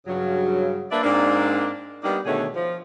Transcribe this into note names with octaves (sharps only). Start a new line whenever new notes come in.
G2 C#3 F#3
A#3 D4 B4 D5 E5
G#2 A#3 C4 D4
G3 A#3 B3 D4 D#4
B2 D3 D#3 A3 G#4 C#5
F3